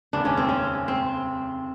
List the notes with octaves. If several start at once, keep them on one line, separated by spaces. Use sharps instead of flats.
F1 D#2 C#3 D4
C#4
C4
C#4
C4